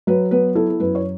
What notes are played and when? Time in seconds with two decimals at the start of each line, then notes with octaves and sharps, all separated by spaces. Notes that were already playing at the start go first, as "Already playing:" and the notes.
0.07 F#3 B4
0.31 B3 B4
0.55 E4 A4
0.70 A4
0.80 F#2 B4
0.95 C#5